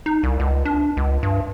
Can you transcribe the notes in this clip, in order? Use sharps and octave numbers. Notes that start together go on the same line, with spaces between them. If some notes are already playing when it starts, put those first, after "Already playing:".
D#4
C2
C#2
D4
C#2
G2